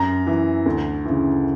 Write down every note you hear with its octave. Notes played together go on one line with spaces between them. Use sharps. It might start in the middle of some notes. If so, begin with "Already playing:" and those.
Already playing: F#2 A#5
E3
D2
C#3 E3